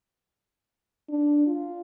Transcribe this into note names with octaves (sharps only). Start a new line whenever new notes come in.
D4
F4